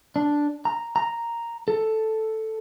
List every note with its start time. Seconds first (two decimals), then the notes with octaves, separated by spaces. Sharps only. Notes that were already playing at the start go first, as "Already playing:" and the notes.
0.16 D4
0.65 A#5
0.96 A#5
1.68 A4